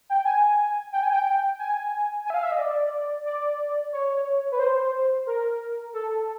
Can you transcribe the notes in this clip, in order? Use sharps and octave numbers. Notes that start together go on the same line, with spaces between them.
G5
G#5
G5
G#5
G5
G#5
G#5
E5
F5
E5
D#5
D5
D5
C#5
B4
C5
A#4
A4